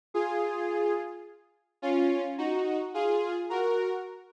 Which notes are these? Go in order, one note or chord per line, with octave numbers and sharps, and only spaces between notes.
F4 G#4
C#4 F4
D#4 F#4
F4 G#4
F#4 A#4